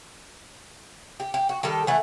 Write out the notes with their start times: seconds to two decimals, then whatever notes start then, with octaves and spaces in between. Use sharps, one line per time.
1.20 G4
1.34 G4
1.49 F#4
1.63 D#3 G3 G4 A4
1.87 E3 A3 F#5